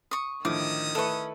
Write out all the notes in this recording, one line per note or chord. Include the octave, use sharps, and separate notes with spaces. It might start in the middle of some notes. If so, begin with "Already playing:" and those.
C#6 D#6
A2 D3 D#3 F3 C#4 D6 D#6
A3 E4 A4 B4 C#6